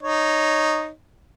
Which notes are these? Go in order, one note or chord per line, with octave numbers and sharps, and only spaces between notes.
D#4 C#5